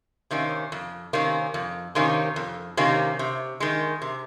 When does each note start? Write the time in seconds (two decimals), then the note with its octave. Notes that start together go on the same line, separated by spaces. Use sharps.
0.31 C3 D#3 A#3 C#4
0.72 F2
1.13 C3 D#3 A#3 C#4
1.54 F2
1.95 C3 D#3 A#3 C#4
2.36 F2
2.77 C3 D#3 A#3 C#4
3.19 C3
3.60 D#3 G#3
4.02 C3